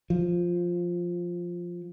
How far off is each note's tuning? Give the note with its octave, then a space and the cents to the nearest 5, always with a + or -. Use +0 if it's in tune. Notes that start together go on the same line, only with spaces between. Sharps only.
F3 +0